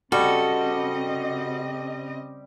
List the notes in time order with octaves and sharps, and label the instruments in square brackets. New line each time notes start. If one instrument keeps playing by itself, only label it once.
[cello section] C#3 C4 D#5 [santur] G3 [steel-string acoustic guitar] F#4 [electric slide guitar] A4